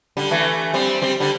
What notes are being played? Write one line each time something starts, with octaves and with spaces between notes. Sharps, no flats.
D3 G3
E3 A3
G3 C4
G3 C4
D3 G3